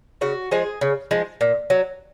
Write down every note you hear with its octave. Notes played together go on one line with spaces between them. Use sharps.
C#3 F#4
F3 G#3 G#4
C#3
F3 G#3
A#2
F#3